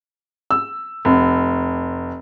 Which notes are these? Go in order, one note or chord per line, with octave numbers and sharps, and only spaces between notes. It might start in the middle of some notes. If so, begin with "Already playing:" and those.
E6
F1